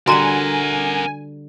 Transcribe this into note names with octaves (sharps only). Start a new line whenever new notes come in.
D3 G3 F#4 A4 A#4 F#5 G#5 A#5